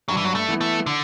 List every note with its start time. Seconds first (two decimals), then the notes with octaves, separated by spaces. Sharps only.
0.08 G2 F#3
0.17 E3
0.24 F#3
0.35 A3
0.48 E3 B3 E4
0.61 A3
0.86 D3